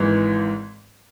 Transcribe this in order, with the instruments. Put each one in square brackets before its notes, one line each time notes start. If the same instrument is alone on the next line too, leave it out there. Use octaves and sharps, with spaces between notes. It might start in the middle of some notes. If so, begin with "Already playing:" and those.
Already playing: [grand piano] G#1 G#2 E3 G#3